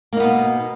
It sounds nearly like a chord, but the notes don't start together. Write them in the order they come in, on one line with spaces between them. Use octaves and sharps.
A#3 D#4 B3 B2